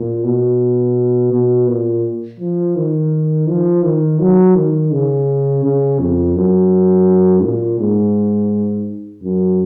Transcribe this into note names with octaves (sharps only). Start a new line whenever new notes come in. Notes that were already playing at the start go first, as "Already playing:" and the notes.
Already playing: A#2
B2
B2
A#2
F3
D#3
F3
D#3
F#3
D#3
C#3
C#3
F2
F#2
A#2
G#2
F#2